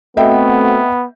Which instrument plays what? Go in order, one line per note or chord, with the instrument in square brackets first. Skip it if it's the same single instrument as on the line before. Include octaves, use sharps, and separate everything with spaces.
[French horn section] A3 C4 F#4 [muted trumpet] B3 [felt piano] D#5 E5 G5